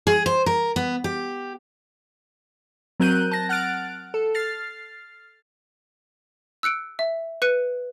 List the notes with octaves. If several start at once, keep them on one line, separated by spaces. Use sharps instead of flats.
G#4
C5
A#4
B3
G4
F#3 C4 A#4 F#6 G6 D#7
A5 A#6
F#5 F6 F#6 A6 D7
A4
F6 A6 C7
E6 F#6 C#7 D7
E5
B4 F#6 C#7 D#7